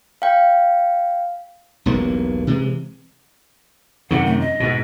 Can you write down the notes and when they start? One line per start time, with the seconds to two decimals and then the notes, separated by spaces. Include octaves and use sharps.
0.22 F5 G5
1.86 E1 B1 G2 A#3
2.47 C3 E3 G#3
4.11 F#2 C3 D#3 F#5
4.25 A3
4.40 D#5
4.60 G#2 B2